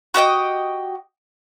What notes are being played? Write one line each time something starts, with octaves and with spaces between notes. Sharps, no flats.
F#4 G4 D#5 G5